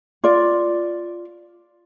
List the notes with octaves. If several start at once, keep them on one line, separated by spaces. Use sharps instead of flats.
F4 D5